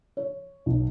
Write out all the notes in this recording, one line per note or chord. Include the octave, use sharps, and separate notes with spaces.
C#5
B1